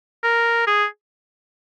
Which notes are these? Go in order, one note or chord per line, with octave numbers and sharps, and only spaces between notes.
A#4
G#4